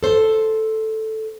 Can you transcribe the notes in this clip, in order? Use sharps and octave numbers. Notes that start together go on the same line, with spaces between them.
A4 C5